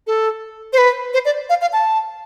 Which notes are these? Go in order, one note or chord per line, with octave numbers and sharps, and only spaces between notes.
A4
C5
B4
C5
D5
F5
F5
A5